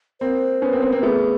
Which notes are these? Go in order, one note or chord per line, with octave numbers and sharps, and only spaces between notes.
A#3 C4 C5
B3 C#4
A#3 C4
A#3 C4
A#3 C4
A3 B3 G#4